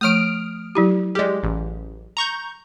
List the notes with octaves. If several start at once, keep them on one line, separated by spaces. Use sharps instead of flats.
F3 A3 D#6 F6 D7
F#3 E4 G4
G#3 G4 G#4 D5
A1
A#5 C#6 G6